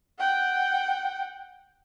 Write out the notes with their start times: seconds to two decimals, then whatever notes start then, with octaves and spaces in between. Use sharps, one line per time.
0.19 F#5 G5